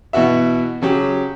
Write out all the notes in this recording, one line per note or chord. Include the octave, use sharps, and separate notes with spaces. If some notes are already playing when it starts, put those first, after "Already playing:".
B2 E3 F#4 E5
C#3 F#3 G4